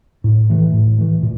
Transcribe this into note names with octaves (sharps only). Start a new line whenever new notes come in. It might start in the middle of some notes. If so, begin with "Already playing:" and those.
A2
E3 A3
A2
E3 A3
A#2